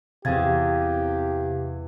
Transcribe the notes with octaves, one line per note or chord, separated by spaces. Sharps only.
E2 C3 G4 G#4 F5 G#6 A6